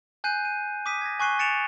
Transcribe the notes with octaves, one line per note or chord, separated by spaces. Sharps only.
G#5 F#6 G6 C7 D#7
D#7
D6 D#6 B6 D#7
G#6 A#6
G#5 C#6 F#6 C7 D#7 G7
A6 C#7 D7 E7 F7